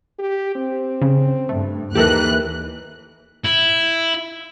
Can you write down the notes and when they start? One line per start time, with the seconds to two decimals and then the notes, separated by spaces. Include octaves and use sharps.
0.19 G4
0.56 C4
1.01 C#3
1.49 G2 A3
1.95 D#2 D#3 E3 G4 A4 A#4 F#6
3.45 E4